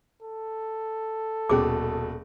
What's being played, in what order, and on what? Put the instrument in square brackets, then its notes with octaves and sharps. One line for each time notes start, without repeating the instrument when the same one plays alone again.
[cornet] A4
[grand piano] D#1 B2 [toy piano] C#4 G#4 D6